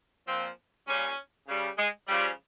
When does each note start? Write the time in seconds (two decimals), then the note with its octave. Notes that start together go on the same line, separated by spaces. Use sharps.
0.26 A#2 F3 C4
0.87 A#2 G3 C#4
1.47 C#3 G3
1.78 G#3
2.08 C#3 F3 G3